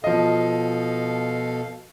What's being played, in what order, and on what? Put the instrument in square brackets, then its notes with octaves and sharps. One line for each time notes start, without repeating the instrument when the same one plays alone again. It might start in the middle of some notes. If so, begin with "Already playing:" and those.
[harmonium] B2 A4 F5 [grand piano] F3 D#5